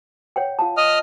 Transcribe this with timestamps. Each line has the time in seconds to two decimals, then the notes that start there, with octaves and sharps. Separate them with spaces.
0.36 C#5 F#5 G5
0.59 F4 F5 A5
0.77 D#5 D#6 F6